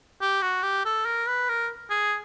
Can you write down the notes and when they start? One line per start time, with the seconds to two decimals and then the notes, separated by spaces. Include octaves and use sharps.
0.21 G4
0.42 F#4
0.63 G4
0.85 A4
1.06 A#4
1.28 B4
1.49 A#4
1.90 G#4